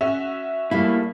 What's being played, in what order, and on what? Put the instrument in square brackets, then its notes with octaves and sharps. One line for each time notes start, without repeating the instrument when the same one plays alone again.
[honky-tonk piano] C#4 F#4 [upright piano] E5
[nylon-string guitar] G3 A3 F5 [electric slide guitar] A#3 E4